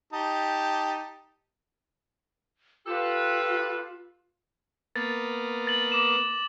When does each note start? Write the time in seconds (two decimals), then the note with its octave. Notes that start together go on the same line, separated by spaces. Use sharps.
0.13 D#4 G4 A5
2.87 F4 G4 A4 B4
4.96 A#3 B3 A6
5.67 A6 F#7
5.92 D6 E7